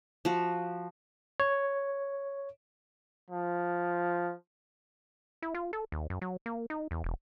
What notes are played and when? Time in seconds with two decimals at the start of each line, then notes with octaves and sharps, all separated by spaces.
0.25 F3 F#4
1.40 C#5
3.30 F3
5.42 E4
5.55 F4
5.73 A4
5.92 D#2
6.10 F#2
6.22 F#3
6.46 A#3
6.70 D#4
6.91 E2
7.04 E1